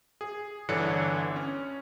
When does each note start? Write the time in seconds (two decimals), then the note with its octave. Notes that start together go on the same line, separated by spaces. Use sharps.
0.21 G#4
0.69 G1 D3 E3 D4 C#5 C#7
1.36 C#4